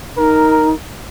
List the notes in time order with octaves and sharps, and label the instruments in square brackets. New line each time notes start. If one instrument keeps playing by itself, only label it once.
[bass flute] D#4 [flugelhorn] A#4